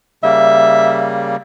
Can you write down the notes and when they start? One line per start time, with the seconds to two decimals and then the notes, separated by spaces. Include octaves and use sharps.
0.23 C#3 G3 A#3 E5